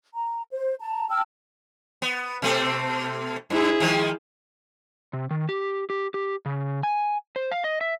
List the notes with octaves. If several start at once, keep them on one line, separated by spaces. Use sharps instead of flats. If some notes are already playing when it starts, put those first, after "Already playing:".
A#5
C5
A5 A#5
G5 A5 E6 F6
B3
B2 A3 C4
G2 E4 G#4
D#3 F3 G#3
C3
D#3
G4
G4
G4
C#3
G#5
C5
F5
D#5
E5